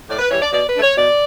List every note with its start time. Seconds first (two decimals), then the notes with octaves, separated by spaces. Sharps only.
0.09 A2 D5
0.19 B4
0.31 E3 G3 C#5
0.42 D5
0.52 B2 D5
0.67 B4
0.74 A3 D4
0.82 C#5
0.96 B2 D5